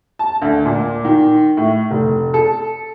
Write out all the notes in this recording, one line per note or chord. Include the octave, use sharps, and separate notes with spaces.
A5
D2
A#2
D#3
A2
F1
A4